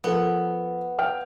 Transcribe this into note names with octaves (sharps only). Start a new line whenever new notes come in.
F3 B3 A4
G5 F6